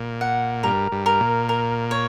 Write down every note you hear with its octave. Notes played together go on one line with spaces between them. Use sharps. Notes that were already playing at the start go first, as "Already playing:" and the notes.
Already playing: A#2
F#5
G2 A#4
G2
A#4
A#2
A#4
C#5